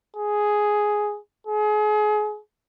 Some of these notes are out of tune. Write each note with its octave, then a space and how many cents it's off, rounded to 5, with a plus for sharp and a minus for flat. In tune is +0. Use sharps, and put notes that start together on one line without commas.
G#4 +5
G#4 +30